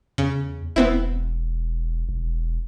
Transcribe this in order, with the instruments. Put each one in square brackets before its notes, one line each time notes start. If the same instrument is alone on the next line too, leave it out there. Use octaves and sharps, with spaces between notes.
[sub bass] E2 [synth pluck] C#3
[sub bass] E1 [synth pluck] B3 C4 E4
[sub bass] E1